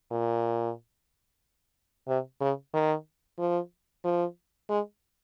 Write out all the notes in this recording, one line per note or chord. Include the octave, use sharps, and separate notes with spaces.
A#2
C3
C#3
D#3
F3
F3
G#3